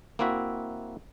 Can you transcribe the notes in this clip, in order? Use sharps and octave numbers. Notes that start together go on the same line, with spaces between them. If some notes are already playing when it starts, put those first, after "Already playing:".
A#3 C4 E4 F#4 E5